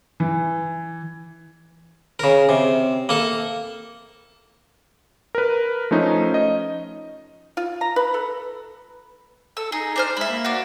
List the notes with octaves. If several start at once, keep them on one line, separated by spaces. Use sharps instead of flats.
E3
C#3 A#4
C3
A#3 A4
A#4 B4
F3 A3 C#4 D#4
D#5
F4
A#5
B4
A4
A4 E6
D#4 G#4
D4 C5 F6
G#3 E5 B5
A#3
D4 F#4